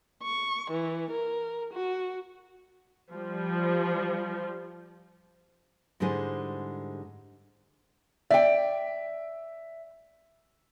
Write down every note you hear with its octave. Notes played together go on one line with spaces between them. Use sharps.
C#6
E3
A#4
F#4
F3 G3
G#2 D3 G3 G#3 E4 C5
D5 E5 G5